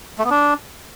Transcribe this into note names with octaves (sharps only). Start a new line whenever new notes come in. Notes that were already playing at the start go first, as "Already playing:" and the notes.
A3
B3
D4